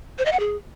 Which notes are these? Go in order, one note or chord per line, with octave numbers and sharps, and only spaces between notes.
C5
D#5
F#5
G#4